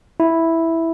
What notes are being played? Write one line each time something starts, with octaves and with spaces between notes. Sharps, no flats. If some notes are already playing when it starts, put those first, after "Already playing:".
E4